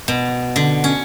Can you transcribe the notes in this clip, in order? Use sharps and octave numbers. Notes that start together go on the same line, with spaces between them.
B2
D3
C#4